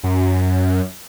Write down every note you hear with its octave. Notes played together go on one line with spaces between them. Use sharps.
F#2